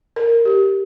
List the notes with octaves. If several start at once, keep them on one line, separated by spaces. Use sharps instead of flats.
A#4
G4